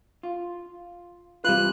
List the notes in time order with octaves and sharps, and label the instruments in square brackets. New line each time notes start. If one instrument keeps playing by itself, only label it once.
[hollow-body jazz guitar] F4
[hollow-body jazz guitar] C3 E3 F4 [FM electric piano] G3 B4 [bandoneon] F#6